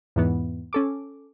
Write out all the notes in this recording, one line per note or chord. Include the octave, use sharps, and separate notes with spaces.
E2 G#2 E3 B3
C#4 A4 D6